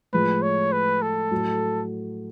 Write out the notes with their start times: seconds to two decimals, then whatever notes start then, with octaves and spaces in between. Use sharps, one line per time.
0.13 A2 F3 G#3 B4
0.42 C#5
0.72 B4
1.02 A4
1.31 A2 F#3 A3